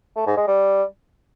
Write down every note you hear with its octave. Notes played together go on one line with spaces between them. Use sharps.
A3
G#2
G#3
G3